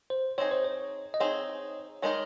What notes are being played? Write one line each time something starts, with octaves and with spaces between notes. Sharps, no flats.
C5
C4 D#4 G#4 C#5
C5
C#5
D#5
C4 D#4 G#4 C#5
D#3 G#3 D#4 A#4 C#5